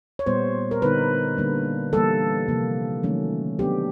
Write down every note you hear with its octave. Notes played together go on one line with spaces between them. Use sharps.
C#5
A#2 G3 B3 C5
A#4
D3 G3 B3 D#4 B4
D3 G3 A#3 D4
E3 G3 A#3 A4
C3 F3 A#3
D#3 F#3 A3 C#4
F#3 B3 D4 G4